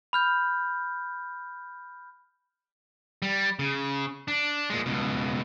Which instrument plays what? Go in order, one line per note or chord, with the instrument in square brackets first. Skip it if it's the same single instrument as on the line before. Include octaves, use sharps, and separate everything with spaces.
[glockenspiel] B5 F6 G6
[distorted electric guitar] G3
C#3
D4
A#2 G#3
C#2 B2